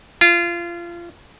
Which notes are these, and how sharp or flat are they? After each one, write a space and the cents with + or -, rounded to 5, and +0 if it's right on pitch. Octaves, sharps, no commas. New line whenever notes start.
F4 -25